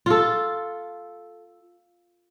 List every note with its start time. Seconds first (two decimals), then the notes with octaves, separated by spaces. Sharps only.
0.06 F4 A4